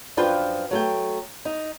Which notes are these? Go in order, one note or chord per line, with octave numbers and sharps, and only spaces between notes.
F#2 F3 D4 F4 B4 G5
F#3 A3 G5
D#4